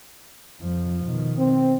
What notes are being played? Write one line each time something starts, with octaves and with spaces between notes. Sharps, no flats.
F2 F3
B2 D#3
C4